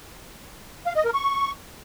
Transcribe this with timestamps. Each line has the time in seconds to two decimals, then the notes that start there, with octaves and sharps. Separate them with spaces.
0.86 F5
0.95 D#5
1.05 A#4
1.14 C#6